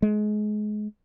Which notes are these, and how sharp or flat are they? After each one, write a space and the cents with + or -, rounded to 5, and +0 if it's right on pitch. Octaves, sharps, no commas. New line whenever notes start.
G#3 +25